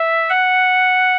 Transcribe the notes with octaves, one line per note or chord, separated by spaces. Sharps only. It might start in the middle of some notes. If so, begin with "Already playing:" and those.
Already playing: E5
F#5